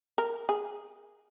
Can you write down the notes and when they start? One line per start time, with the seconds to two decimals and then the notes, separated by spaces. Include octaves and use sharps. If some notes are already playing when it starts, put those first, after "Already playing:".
0.18 A#4
0.49 G#4